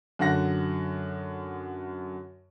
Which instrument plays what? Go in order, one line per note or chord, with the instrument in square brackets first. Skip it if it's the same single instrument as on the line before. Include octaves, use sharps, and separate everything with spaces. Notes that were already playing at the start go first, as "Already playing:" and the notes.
[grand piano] F#2 D3 F#5 A#6